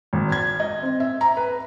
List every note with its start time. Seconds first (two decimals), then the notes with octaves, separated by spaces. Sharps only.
0.13 G#1
0.32 G#6
0.60 D#5
0.83 C4
1.00 E5
1.21 A#5
1.37 B4